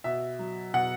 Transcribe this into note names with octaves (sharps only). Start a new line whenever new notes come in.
B2 E5
F#3
B2 F#5